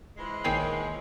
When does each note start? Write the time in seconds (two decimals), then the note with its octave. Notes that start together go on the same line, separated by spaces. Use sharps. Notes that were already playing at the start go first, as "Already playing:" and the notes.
0.16 E3 F3 G#3
0.44 A#1 D#3 A#3 G#4 C#5 G5 C7